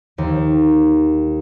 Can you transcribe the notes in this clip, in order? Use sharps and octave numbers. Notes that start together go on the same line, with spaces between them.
D#2